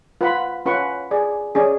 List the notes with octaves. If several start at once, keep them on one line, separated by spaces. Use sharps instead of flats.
F4 B4 F#5 B5
C#4 F4 B4 F#5 C#6
G#4 D5 G#5
C#4 G#4 D5